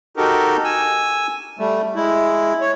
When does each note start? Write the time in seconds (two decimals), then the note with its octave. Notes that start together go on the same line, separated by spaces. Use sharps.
0.17 D#4 F#4 G4 A4 A#4
0.64 G#5 E6
1.59 G3 A3
1.96 G#3 E4
2.61 C#5